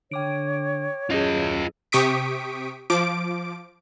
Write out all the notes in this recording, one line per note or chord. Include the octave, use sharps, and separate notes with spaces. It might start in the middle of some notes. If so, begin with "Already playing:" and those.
D3 C#5 G5 D6 D7
F#2 C#4 F4 G#4 D#5
C3 G4 C#6 D#6 B6 D7
F3 D6 D7